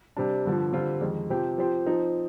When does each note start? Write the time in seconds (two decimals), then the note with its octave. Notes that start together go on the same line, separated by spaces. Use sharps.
0.17 C3 G3 D4
0.45 G2 D3 F3
0.73 D3 G3 C4 F4
1.01 F2 D#3 G#3
1.30 C3 F3 C4 G4 C5
1.58 F3 C4 G4 C5
1.86 F3 C4 D#4